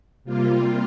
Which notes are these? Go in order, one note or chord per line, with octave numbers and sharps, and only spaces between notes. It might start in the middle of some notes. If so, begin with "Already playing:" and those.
C3 G3 A#3 F4